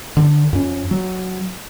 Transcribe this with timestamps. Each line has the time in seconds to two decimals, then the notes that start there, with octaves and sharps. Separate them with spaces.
0.17 D3
0.53 F2 C#4
0.91 F#3